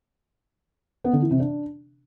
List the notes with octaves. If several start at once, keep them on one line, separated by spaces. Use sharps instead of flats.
B3
D3
E3
C3
D4